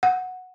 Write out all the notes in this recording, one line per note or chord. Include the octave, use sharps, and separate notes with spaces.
F#5